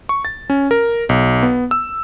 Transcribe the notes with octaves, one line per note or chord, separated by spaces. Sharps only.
C#6
A6
C#4
A#4
B1
B3
E6